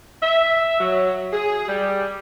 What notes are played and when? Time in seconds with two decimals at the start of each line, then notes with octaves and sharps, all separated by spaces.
0.23 E5
0.80 F#3
1.32 G#4
1.68 G3